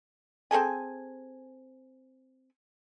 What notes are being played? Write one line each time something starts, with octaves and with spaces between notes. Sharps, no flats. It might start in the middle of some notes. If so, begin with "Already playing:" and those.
C4 G#4 A4 G#5